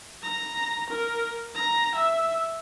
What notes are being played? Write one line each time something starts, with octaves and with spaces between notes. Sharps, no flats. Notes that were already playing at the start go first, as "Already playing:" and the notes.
A#5
A#4
A#5
E5